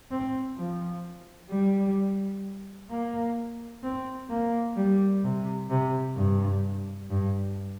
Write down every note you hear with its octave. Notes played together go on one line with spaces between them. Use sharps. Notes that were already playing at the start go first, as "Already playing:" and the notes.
C4
F3
G3
A#3
C4
A#3
G3
C3
C3
G2
G2